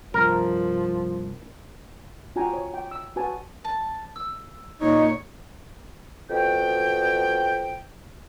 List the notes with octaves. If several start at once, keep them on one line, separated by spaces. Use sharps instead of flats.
C2 G2 F3 A#4
F4 F#4 G5 G#5 A#5
C#5
G5
E6
F#4 B4 G#5 A5
A5
E6
A#2 D#4 C#5 D#5
F2 B2 G5